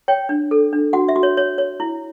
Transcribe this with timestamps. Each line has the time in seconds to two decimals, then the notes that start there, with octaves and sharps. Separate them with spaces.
0.08 C#5 G5
0.29 D4
0.51 A4
0.73 D4
0.93 F#4 F#5
1.09 E5
1.16 F#4
1.23 C#5
1.37 C#5
1.58 C#5
1.80 E4